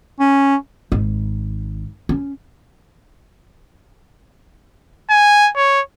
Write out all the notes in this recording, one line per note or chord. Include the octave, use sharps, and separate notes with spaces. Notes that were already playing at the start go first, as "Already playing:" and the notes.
C#4
G#1 D#4
C#4
G#5
C#5